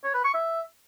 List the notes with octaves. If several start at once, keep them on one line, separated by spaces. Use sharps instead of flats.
C#5
B4
C#6
E5